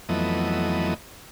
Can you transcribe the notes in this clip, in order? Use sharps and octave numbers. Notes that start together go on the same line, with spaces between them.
F2 E3 F#3 A3 B3 D#5